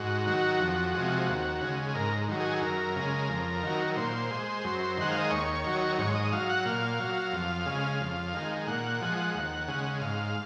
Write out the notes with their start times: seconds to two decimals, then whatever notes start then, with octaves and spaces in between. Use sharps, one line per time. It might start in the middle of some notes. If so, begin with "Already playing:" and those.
Already playing: G#2 F#4
0.26 D#3 F#3
0.60 F2
0.94 C3 F3 G#3
1.28 D#2
1.61 C#3 G#3
1.94 G#2 A#4
2.28 D#3 F#3
2.40 G#4
2.62 F#2 A#4
2.96 C#3 G#3
3.29 F2
3.63 D#3 F#3
3.97 A#2 C5
4.31 G#3
4.64 F#2
4.97 D#3 G#3 F#5
5.11 F5
5.21 D#5
5.31 D#2 C#5
5.64 D#3 F#3
5.99 G#2 C#5
6.15 D#5
6.32 F#3 F5
6.49 F#5
6.66 A#2 F5
7.00 F#3
7.32 F2
7.66 C#3 G#3
8.00 F2
8.34 D#3 G#3
8.67 A#2 F#5
9.01 F3 G#3
9.35 D#2
9.68 C#3 G#3
10.01 G#2 F5